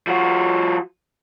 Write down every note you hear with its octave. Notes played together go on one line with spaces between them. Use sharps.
F3 F#4